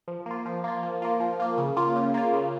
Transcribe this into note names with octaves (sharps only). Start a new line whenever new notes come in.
F3
A#3 F4
F3
A#3 F4
F3
A#3 F4
F3
A#3 F4
C#3
A#3 F4
C#3
A#3 F4
C#3